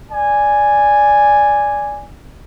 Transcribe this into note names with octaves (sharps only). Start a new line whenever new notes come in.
D5 G#5